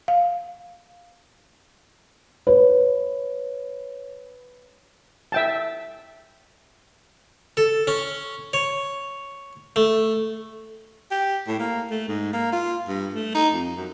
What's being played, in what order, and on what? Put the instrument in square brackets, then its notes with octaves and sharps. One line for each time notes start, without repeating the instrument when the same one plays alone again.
[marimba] F5
[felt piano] B4 [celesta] C#5
[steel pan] E5 G5 A5
[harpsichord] A4
C#4
C#5
A3
[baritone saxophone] G4
A2
A#3
A3
G#2
A#3
F4
G2
A3
D#4
F2
F#2